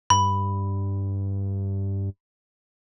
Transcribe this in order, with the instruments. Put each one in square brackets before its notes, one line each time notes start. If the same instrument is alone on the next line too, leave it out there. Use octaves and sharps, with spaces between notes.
[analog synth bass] G2 [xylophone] B5